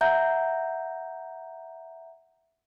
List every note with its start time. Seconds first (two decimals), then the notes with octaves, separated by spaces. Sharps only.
0.01 E5 F#5 A#5 G6